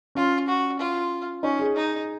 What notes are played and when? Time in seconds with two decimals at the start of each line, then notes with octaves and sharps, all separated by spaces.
0.15 C#4 F4
0.48 F#4
0.79 F4
1.43 C#4 D#4
1.60 G#4
1.76 D#4